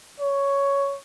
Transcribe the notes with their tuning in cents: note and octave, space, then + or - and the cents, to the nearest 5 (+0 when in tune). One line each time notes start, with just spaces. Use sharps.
C#5 +5